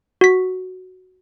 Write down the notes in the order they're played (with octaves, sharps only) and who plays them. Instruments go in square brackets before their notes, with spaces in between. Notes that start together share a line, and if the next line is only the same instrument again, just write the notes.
[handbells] F#4 B6